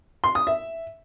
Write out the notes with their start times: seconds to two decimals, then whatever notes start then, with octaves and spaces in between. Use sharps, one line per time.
0.24 C6
0.35 D#6
0.47 E5